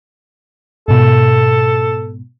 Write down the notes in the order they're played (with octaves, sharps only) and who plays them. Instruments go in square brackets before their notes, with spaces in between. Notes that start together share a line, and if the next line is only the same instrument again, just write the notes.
[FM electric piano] G#2 B2 [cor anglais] A4